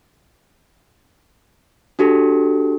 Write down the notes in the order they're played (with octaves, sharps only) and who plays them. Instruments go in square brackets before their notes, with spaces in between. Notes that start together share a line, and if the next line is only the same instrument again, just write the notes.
[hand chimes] D4 F#4 G4 A4